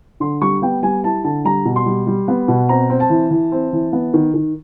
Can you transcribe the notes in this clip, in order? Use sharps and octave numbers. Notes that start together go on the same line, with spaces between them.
D3 C6
G3 C#6
B3 G5
G3 G#5
E4 A5
D3 A5
G3 A#5
B2
C6
G3
G3
B3
B2
C4 A#5
C4
A5
E3
E3
C4
E3
B3
D#3
D#3